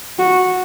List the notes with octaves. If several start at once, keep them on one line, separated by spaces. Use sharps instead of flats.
F#4